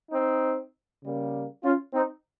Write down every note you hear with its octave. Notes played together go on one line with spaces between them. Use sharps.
C4 D#4
C#3 G3 A#3
C#4 F4
C4 D#4